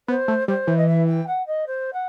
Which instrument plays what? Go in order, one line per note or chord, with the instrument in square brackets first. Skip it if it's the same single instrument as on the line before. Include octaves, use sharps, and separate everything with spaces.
[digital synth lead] B3 [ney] C5
[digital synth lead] A3
[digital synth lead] G3 [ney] C5
[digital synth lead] E3
[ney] D#5
E5
G5
F#5
D#5
C5
F#5